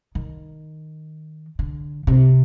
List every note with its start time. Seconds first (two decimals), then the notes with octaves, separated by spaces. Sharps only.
0.15 D#3
1.59 D3
2.07 C3